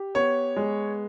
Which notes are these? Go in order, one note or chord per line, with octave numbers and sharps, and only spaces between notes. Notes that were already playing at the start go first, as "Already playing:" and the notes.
Already playing: G4
B3 C#5
G#3